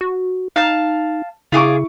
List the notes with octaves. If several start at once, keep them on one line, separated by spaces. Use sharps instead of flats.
F#4
D#4 F5 A5
C#3 E4 F4 G#4 C#6 D6